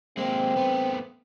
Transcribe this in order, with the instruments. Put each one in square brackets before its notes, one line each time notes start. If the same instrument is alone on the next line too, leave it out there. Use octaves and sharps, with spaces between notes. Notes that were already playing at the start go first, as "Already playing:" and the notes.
[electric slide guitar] G#3 A#3 [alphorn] C4
[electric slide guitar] A3 B3